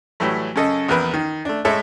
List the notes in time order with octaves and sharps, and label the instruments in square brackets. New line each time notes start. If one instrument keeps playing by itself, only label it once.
[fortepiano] A2 E3 F#3 G3 A3
F#2 C#3 A4 D#5
A#1 E2 A#4 B4
D#3
A3 D4
A2 G#3 A4 C#5 E5